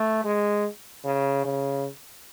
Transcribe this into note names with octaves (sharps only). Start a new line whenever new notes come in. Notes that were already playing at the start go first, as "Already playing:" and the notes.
Already playing: A3
G#3
C#3
C#3